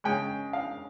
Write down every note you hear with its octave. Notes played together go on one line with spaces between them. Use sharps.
C#3 G#3 C#4 G5
F5